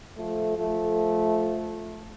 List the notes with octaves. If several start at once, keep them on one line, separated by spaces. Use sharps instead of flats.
F3 A3
F3 A3